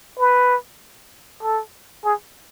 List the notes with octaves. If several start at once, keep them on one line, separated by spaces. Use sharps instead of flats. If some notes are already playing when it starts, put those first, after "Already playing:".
B4
A4
G#4